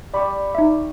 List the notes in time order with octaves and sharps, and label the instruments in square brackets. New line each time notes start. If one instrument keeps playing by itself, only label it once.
[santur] G3 C#6 [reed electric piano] D5 B5
[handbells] D#4 E5